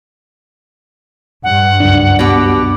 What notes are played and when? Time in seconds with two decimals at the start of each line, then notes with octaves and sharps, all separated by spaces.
1.43 G2 F#5
1.80 C#2 F#2 D4
2.19 B2 G4